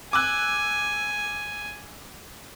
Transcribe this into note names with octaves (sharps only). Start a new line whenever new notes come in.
G#5 D6 E6 F#6